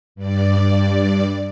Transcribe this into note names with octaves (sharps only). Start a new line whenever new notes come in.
G2 D5